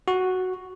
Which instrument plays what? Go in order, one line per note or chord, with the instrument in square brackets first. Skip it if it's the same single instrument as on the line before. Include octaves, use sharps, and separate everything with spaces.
[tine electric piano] F#4